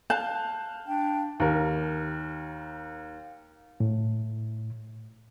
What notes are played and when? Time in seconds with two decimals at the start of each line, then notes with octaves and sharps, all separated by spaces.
0.10 F5 A5 F#6 G6
0.87 D4 G5
1.40 D#2 A#4
3.80 A2